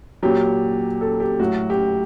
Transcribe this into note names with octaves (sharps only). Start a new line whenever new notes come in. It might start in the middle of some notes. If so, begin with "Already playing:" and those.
A#2 F#3 G4
A4
G4
A2 F#3 F#4
G4